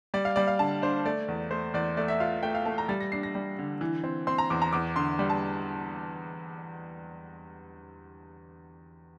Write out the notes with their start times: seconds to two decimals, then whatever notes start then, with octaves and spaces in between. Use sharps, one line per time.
0.14 G3 D5
0.25 F5
0.36 G3 D5
0.48 F5
0.59 D3 A5
0.82 D4 C5
1.06 A3 D5
1.28 E2
1.51 A3 C5
1.74 E2 D5
1.97 A3 D5
2.08 E5
2.20 F4 F5
2.43 A3 G5
2.55 F5
2.65 A3 A5
2.78 A#5
2.89 G3 A6
3.00 A#6
3.12 D4 C7
3.23 A#6
3.35 G3
3.59 D3
3.81 E3
4.04 C4
4.27 C4 C6
4.38 A#5
4.50 E2 D6
4.62 A#5
4.73 E2 D6
4.96 D3 C6
5.19 G3
5.30 A5